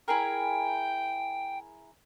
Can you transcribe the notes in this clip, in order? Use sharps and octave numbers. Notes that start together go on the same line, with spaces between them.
E4 G#4 A#4 G5